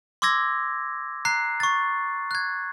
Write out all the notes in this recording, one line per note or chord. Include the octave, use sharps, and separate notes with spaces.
C6 D6 E6 G#6 A#6
A#5 F#6 C7
C#6 A6
F#6 G#6